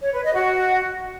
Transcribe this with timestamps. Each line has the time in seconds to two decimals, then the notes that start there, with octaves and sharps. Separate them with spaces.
0.01 C#5
0.12 B4
0.23 D#5
0.34 F#4